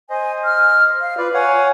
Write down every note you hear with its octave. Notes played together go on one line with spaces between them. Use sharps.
C5 D#5 G#5
F6
F5
F4 B4 D5
C#5 F5 F#5 G#5